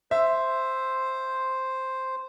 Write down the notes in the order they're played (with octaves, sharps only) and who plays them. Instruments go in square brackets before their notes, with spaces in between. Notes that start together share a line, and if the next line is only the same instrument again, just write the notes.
[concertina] C5 [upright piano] E5